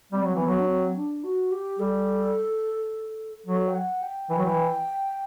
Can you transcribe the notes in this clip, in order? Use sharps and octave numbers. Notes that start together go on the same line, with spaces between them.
G3 C4
F#3
E3
B3
F#3
D4
C4
D4
F#4
G4
G3 A4
F#3 A4
G5
F#5
G5
E3
F#3
E3